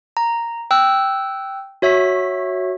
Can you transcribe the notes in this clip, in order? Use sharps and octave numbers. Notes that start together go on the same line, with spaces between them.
A#5
G5 E6 F#6
F#4 C#5 E5 B6